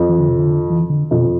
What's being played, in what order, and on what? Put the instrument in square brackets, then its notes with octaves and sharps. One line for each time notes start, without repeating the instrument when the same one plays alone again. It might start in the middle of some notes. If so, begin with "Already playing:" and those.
Already playing: [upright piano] F2
[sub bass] E3
D3
C3
D3
E3
D3
[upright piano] F2 [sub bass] B2